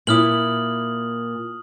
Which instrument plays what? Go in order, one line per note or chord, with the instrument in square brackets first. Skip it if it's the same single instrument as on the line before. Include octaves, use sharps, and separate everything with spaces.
[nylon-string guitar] A#2 E4 [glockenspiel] D#6 F6 F#7